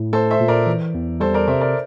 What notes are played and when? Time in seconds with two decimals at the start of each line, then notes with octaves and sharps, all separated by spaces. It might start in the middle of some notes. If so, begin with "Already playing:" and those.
Already playing: A2
0.13 A3 A4 C5
0.31 C5 E5
0.40 A#2
0.48 A#4 D5
0.66 E3
0.94 E2
1.20 G3 A4 C5
1.34 A#4 D5
1.48 C3 C5 E5
1.61 A#4 D5